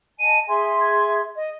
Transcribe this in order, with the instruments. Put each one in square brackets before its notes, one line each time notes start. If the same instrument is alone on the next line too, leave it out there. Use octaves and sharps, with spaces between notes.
[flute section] D#5 G#5 A5 [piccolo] D#7
[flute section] G#4 E5 C6 [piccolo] G#5
[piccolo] G#6
D#5